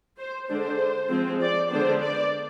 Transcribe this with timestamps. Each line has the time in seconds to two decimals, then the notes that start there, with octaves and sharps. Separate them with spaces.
0.18 C5
0.48 D3 G#3 D4 C5
1.09 F3 G#3 C4
1.40 D5
1.70 D3 G#3 B3 D4 C5
2.00 D5